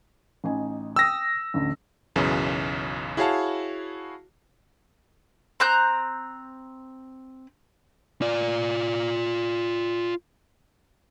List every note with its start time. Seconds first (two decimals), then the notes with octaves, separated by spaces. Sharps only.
0.44 A1 D#4 G#5
0.96 G5 D#6 E6 A#6
1.54 A1 D2
2.16 B1 F#2 C#3 E3
3.17 E4 F#4 G#4 C#5 F5 A5
5.60 C4 A#5 F#6 G6
8.22 F4 D5